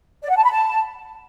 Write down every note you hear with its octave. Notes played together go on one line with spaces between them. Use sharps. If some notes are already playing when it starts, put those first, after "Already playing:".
D5
F#5
A5
B5
A5